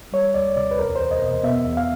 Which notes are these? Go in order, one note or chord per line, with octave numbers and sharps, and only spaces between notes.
G3 C#5
D2 D5
C3 D5
B4
E2 A#4
E2 C5
D#5
B2
B3 E5
E2
F5